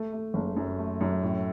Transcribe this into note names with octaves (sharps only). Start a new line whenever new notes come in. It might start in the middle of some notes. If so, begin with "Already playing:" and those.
Already playing: A3
A3
F#1
F#2
A3
F#2
A2